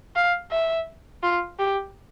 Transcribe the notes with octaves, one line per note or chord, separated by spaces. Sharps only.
F5
E5
F4
G4